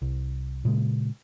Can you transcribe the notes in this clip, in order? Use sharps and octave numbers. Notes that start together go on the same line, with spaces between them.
C2
A#2 C#3 G#3